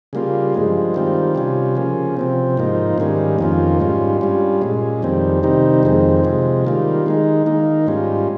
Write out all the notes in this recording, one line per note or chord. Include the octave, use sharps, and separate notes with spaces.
C#3 G3 A#3 F4
G2 F3 G#3
D#3 G3 C4 F4
C3 G3 C#4 F4
C#3 F3 A#3 C#4
C3 F3 C4
G#2 F3 A#3 D#4
G#2 D#3 G3 A#3 C#4
F2 D#3 A#3 C#4 F4
G#2 G3 C#4 F4
G2 G3 C#4 F4
A#2 G#3 C#4
F2 D#3 G3 C4
C3 D#3 G3 C4 D#4
F2 D#3 G#3 C4
C3 F3 G#3
D#3 G3 A#3 F4
D#3 G#3 D#4
D#3 A#3 D#4
G#2 G3 C#4 F4